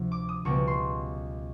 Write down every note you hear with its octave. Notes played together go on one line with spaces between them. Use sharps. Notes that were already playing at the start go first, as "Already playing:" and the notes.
Already playing: D2 C3 F3
D6
D#6
C#2 B2 G3 C#6
C6